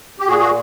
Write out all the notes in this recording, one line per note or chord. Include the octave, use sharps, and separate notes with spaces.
G4
A#2 F#4 G#4
F#4